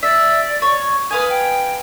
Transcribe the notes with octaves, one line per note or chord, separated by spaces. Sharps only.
D5 E5
C#5
B4 F5 G#5 D#6
G5